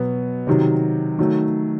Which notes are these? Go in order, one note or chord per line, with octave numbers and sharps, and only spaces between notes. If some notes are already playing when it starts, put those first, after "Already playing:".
Already playing: B2 F#3 B3
C3 D#3 F#3
D#3 F#3 A3